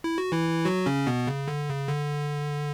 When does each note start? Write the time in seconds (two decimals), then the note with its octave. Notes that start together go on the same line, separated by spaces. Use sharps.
0.04 E4
0.18 F#4
0.32 E3 E4
0.65 F#3 F#4
0.86 C#3 C#4
1.07 B2 B3
1.27 C#3
1.48 D3
1.69 C#3
1.88 D3